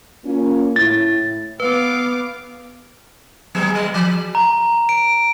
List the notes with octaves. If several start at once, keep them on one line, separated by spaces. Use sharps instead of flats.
A#3 C#4 F4
A2 E4 A6
B3 B4 F5 D6
F#3 B3 G#4
G3 G#3 D#5
F3
A#5
D7